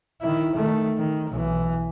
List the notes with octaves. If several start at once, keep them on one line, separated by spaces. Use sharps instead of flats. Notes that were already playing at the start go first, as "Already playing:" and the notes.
D#3 E4
D#3 A3
D#3
B1 E3